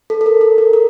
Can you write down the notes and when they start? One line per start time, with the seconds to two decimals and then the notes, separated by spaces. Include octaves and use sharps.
0.10 A4
0.21 A4
0.26 A#4
0.41 A4
0.58 A#4
0.73 A#4